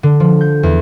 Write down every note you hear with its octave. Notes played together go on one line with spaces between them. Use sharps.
D3
F3
G6
E2